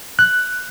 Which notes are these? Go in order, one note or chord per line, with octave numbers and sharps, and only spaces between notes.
F#6